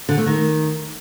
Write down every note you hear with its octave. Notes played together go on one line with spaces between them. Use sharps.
D3
A3
D#3